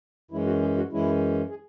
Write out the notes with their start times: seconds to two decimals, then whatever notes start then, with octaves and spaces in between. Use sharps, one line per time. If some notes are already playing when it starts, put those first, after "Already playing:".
0.31 F#2 E3 G#3 C#4 E4
0.46 F#4
0.62 G#4
0.77 F#4
0.92 F#2 E3 G#3 C#4 E4
1.50 G#4